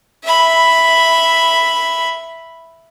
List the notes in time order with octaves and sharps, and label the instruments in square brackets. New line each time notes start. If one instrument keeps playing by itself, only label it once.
[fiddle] E5 B5